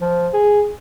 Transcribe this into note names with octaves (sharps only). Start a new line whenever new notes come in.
F3
G#4